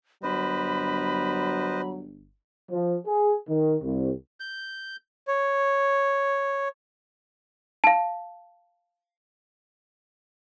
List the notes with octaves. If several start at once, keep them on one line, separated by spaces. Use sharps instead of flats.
G1 F#3 B4 C5 D#5 B5
F3
G#4
D#3
C2
G6
C#5
F5 A5